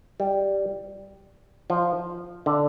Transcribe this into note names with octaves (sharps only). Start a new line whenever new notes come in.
G3
F3
D3